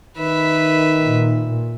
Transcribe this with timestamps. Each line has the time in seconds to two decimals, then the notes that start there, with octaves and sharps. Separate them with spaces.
0.18 D#3 D#4 B4 E5
1.01 A#2